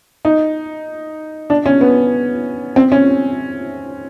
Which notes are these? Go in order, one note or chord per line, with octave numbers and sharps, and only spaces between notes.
D#4
D4
C#4
B3
C4
C#4